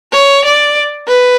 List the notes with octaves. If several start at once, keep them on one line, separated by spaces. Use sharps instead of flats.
C#5
D5
B4